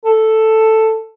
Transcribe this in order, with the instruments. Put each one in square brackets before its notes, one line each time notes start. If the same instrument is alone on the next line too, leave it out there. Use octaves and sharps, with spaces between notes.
[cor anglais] A4